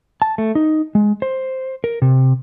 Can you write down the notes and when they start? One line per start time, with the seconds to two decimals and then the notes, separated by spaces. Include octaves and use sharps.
0.22 A5
0.38 A3
0.55 D#4
0.95 G#3
1.22 C5
1.84 A#4
2.02 C3